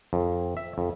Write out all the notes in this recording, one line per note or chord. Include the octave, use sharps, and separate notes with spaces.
F2
E5
F2